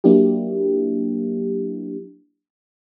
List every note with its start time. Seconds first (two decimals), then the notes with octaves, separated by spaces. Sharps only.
0.04 F#3 A#3 D4 E4 G4